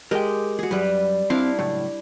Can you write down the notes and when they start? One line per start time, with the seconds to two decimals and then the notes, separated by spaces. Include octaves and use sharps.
0.11 G#3 G4 A#4 G5
0.59 F#4 G#4
0.71 F#2 G3 B4
1.30 C4 D4 E4 F5
1.59 C#2 F#2 A2